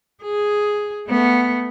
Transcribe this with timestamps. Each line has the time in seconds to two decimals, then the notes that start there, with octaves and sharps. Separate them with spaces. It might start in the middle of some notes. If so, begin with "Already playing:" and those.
0.23 G#4
1.08 A3 B3